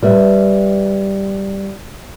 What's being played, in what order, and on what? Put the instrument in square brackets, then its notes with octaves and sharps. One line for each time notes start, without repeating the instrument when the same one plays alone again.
[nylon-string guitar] G3 B4 E5